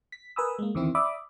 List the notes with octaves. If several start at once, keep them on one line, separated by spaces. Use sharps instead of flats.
B6
A#4 B4 G#5 B5 D#6 E6
G#3 A#3
E2 D3 D#3 C4 E4
D5 E5 B5 D6 D#6